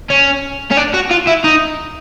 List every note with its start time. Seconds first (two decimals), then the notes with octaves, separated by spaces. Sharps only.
0.10 C#4
0.71 C#4
0.77 D4
0.94 F#4
1.11 F4
1.27 E4
1.44 D#4